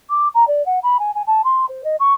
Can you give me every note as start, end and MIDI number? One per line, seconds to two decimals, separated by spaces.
0.10 0.28 86
0.34 0.46 82
0.47 0.64 74
0.66 0.79 78
0.83 0.97 83
0.99 1.13 80
1.15 1.22 80
1.27 1.42 81
1.44 1.65 84
1.69 1.82 72
1.84 1.96 75
2.00 2.14 85